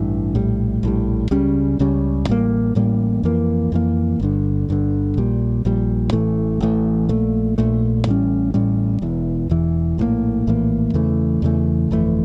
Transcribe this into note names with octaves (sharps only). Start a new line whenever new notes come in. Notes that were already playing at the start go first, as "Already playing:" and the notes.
Already playing: A1 G2 E3
A#1 A2 G3
A#1 A2 G3
C#2 C#3 G3 C#4
C#2 C#3 G3 C#4
A1 A2 G3 A#3
A1 A2 G3 A#3
F2 E3 A#3
F2 E3 A#3
G1 G2 D3
G1 G2 D3
A#1 A#2 G3
A#1 A#2 G3
A1 A2 E3 A3
A1 A2 E3 A3
A#1 A#2 A3
A#1 A#2 A3
A1 A2 G3 C#4
A1 A2 G3 C#4
E1 E2 E3
E1 E2 E3
A#1 A2 E3 A#3
A#1 A2 E3 A#3
E2 C#3 E3 A3
E2 C#3 E3 A3
G1 F2 E3 A3